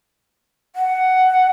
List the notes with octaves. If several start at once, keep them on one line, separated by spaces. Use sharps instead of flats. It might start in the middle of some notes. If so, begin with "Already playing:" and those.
F#5